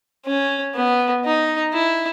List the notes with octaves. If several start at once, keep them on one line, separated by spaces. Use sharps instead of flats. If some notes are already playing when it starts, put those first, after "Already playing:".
C#4
B3
D#4
E4